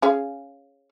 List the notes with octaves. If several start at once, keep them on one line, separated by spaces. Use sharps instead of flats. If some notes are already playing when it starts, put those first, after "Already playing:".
C#4 G#4 F5